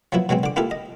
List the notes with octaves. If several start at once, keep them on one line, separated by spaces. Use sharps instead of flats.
F3 F#3 B3 E4
B2 F#3 G#3 C4
D3 D6
A#3 E4 F4 G4 A4
D#5